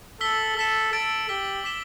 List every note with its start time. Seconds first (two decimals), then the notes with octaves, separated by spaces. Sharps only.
0.21 A4 E6 B6 G7
0.56 A4 E6 B6 E7
0.93 A4 E6 A6 D7
1.29 G4 E6 B6 D7 G7
1.64 D6 B6 E7 G7